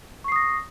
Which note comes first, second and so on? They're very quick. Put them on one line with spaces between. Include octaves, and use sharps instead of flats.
C#6 C7 D#6 A#6